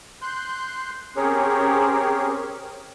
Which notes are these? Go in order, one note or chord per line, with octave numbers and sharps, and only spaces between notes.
C6 F#6 G6
C4 C#4 G4 G#4 A#4 C#5